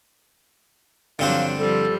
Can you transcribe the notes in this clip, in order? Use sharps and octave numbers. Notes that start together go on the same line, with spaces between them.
G2 D3 F3 F#3 C4 D4 F5
F3 G3 A4